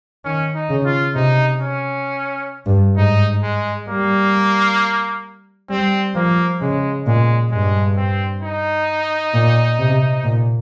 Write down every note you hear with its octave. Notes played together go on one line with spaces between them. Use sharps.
D#3 C#4
D#4
C#3
F4
C3 D#4
C#4
G2
G#2 D#4
G#3
G3 A#3
G3 C4
F3 A#3
C#3 G#3
A#2 G#3
G2 G#3
C4
D#4
A#2
C3
A#2